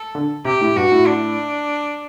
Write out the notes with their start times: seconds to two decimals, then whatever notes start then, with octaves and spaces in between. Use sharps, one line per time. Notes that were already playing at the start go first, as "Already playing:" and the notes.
Already playing: A4
0.15 D3
0.45 C3 G4
0.61 A2
0.76 G2 F#4
0.92 A2
1.07 D4